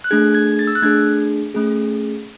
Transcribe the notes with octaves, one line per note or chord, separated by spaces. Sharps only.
F#6
A3 D4 G#4 G#6
G#6
A6
E6
F#6
A3 D4 G#4 G#6
A3 C#4 G#4